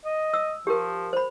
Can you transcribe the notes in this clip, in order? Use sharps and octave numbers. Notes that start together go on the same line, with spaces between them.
D#5
E6
F3 G4 A#4
C5 B5